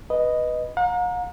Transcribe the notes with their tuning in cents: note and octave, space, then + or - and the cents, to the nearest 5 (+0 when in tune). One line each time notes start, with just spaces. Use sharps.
B4 +0 D#5 +0
F#5 -45 A#5 +5